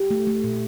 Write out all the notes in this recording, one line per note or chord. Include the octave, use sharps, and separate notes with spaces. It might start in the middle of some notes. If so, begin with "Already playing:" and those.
Already playing: G4
A3
A3
A#2